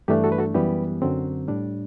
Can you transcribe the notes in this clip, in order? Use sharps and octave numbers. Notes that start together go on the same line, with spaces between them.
G2 E3 A3 D4 G4
F#4 A4
B4
F#4 A4
F#2 E3 G3 B3 G4 B4
F#2 D3 F#3 C4
A2 G3 D4